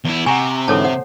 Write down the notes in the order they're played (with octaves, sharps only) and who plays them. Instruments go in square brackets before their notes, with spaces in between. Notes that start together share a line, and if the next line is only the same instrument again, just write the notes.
[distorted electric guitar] E2 E4
[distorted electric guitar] C3 [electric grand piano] F#5 A#5 C#6 [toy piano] G#5
[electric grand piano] G#2 D3 E3 [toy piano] A4 C#5 A5
[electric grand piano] C5 [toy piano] F#5